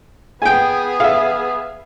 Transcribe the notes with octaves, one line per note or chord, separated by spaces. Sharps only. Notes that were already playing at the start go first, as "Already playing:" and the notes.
B3 G#4 G5 G#5
E5 F5